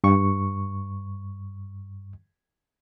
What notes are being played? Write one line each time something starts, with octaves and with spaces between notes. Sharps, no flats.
G2 C#6